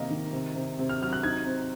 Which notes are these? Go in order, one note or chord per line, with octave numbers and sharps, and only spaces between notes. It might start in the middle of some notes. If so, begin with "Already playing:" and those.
Already playing: C3 D#3 A#3 D#5 F5
D#3
C3
C3
C3
F6
F#3 F6
F#6
D#4 G#6
C4